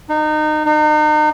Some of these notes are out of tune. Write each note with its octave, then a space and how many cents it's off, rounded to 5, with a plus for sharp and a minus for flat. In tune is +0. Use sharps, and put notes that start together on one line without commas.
D#4 -25
D#4 -35